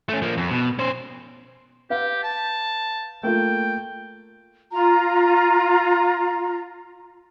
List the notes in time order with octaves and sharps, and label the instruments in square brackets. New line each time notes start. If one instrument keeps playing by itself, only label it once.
[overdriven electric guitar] A3 C#4
F3 A#3
F2
B2
C#4 C5
[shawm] G4 [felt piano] B4 F5 F#5
[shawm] A5
[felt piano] A3 A#3 F4 [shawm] G5
[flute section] F4 A#5